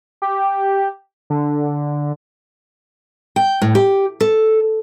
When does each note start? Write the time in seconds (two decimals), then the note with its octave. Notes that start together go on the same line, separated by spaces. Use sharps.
0.22 G4
1.30 D3
3.36 G5
3.62 A2
3.75 G4
4.21 A4